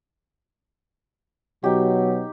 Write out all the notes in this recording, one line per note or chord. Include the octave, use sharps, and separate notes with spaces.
B2 F#3 D#4 G4